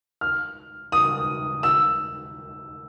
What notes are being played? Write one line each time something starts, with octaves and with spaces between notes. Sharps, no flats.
F6
D#6
E6